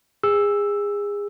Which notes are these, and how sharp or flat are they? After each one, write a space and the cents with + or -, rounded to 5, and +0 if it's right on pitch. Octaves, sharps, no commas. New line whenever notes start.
G#4 -25 E6 +0